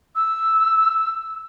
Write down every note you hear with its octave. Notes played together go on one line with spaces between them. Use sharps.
E6